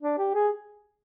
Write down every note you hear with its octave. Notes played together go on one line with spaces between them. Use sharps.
D4
G4
G#4